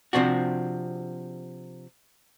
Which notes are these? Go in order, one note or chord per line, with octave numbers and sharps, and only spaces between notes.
C3 F3 C4 D4 F#4